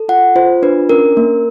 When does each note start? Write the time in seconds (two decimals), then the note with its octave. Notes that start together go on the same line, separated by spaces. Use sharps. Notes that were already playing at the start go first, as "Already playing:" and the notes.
Already playing: A4
0.09 F4 F#5
0.36 F4 C5
0.62 D4 B4
0.89 C#4 A#4
1.17 A#3